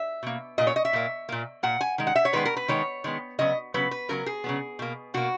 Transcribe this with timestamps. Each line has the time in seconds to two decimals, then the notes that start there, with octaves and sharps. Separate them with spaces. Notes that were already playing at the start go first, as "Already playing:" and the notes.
Already playing: E5
0.23 B2 A#3
0.58 A#2 A#3 D#5
0.67 C#5
0.76 D#5
0.85 E5
0.93 A#2 A#3
1.29 A#2 A#3
1.63 A#2 A#3 F#5
1.81 G#5
1.98 D#3 G#3
2.07 F#5
2.15 E5
2.25 C#5
2.33 D#3 G#3 B3 B4
2.45 A#4
2.57 B4
2.68 D#3 G#3 B3 C#5
3.04 D#3 G#3 B3
3.39 C#3 F#3 B3 D#5
3.74 C#3 F#3 B3 B4
3.91 B4
4.09 C#3 F#3 B3 A#4
4.26 G#4
4.44 C#3 F#3 B3
4.79 B2 A#3
5.14 B2 A#3 F#4